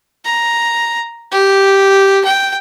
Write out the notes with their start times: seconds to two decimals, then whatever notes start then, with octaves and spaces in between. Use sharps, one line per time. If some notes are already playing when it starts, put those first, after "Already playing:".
0.24 A#5
1.31 G4
2.25 G5